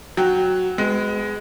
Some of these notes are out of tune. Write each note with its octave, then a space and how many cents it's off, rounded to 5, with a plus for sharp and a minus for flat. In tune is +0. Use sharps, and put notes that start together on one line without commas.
F#3 +0 G5 +0
G#3 +5 B3 +35